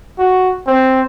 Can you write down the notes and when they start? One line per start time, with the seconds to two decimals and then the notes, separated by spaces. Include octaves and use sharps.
0.19 F#4
0.67 C4